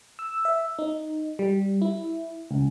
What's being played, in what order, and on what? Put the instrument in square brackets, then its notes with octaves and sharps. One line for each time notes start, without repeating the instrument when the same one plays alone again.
[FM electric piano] E6
E5
D#4
G3
E4
C#2